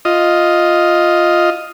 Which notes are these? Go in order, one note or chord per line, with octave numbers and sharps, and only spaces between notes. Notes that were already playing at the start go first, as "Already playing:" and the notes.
F4 D#5